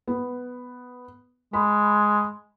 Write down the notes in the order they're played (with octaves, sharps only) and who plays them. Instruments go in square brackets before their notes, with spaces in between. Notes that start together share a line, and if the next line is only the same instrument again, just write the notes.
[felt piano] B3
[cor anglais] G#3 [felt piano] B5